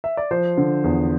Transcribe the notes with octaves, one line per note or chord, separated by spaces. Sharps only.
E5
D5
F3 C5
D3
E2